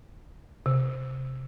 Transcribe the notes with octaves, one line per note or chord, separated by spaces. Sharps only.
C3